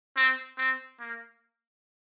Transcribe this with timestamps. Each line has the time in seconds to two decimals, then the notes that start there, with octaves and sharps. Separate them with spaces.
0.16 C4
0.58 C4
1.00 A#3